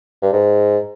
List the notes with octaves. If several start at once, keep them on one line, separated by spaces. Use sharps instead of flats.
G2
G#2